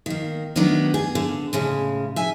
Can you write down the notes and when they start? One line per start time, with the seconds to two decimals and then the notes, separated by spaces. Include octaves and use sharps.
0.06 D#3 A#3
0.56 D#3 F#3 A3 B3 D4 D#4
0.94 G#4
1.15 D3
1.53 A2 C#3 G#3
2.16 E5 G#5